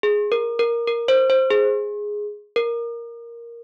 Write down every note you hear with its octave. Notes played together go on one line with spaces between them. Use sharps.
G#4
A#4
A#4
A#4
C5
C5
G#4
A#4